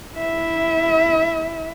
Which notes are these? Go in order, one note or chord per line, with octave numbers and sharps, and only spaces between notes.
E4 E5